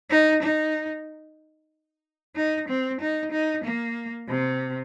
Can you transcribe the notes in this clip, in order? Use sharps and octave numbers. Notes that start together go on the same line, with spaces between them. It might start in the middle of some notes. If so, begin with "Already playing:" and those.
D#4
D#4
D#4
C4
D#4
D#4
A#3
C3